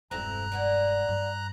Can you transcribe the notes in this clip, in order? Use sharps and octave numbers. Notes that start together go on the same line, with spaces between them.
E1 G2 C4 E4 A4 A#5 F#6
A#3 B3 D4
G2